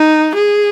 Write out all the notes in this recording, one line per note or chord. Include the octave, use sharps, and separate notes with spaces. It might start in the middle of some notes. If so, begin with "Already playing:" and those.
Already playing: D#4
G#4